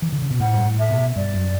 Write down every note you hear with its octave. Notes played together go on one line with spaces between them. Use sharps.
E3
D3
C#3
B2
A2 F#5
G2
A2
E5
B2
G2 D5
F#2